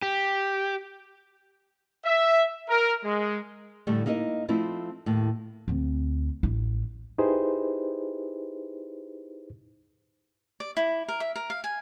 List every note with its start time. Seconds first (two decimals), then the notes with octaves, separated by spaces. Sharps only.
0.02 G4
2.05 E5
2.69 A#4
3.04 G#3
3.87 A2 D3 G3 A3
4.06 A#3 D#4 E4 A#4 D#5
4.48 F3 A3 C4 E4 F4
5.06 D#2 A2
5.68 D2 C4
6.43 A1 E4
7.18 D#4 E4 G4 G#4 B4 C5
10.60 D5
10.77 E4
11.08 A#4
11.20 E5
11.36 A#4
11.50 F5
11.64 G#5